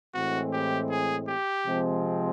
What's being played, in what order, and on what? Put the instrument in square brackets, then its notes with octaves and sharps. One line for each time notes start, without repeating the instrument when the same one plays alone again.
[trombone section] A2 E3 G#3 C4 [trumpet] F#4
[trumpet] G4
G#4
G4
[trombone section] C3 F3 G#3 C4